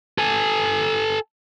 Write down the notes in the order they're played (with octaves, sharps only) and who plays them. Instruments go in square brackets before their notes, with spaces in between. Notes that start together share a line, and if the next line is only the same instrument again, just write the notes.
[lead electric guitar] A4 G#5